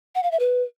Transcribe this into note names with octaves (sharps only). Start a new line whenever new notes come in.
F#5
F5
E5
B4